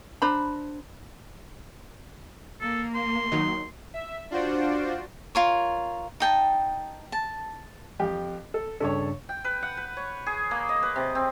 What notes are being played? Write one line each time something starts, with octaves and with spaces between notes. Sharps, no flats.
D4 C5 A#5 B5
A#3 A4
C6
D#3 F#3 D#4
E5
D4 F4 F#4 C5 D5
F4 A#4 C#5
D#4 G5 A5
A5
F2 G4
A4
G2 C#3 D4 A4 C#5
G5
B4
F#5
B4
C#5
G#4
A#3
D#5
B4
C3
C4